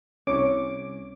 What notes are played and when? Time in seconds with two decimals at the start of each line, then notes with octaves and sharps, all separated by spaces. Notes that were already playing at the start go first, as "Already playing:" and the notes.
0.27 C2 C#4 C#5 D6